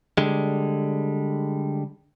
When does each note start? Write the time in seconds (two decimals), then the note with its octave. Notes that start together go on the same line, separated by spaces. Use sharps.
0.18 D3 G3 G#3